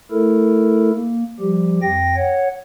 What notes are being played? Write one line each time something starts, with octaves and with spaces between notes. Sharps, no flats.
A3 E4 A4 A#4
A#3
F3 G3 G4
F2 G5 A#6
C#5 F#5